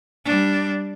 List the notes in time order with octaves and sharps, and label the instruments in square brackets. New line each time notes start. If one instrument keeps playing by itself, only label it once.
[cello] G3 D4